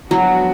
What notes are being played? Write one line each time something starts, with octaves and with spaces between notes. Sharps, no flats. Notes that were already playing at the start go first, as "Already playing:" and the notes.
F3 F#3 G#3 B3 D4 F#4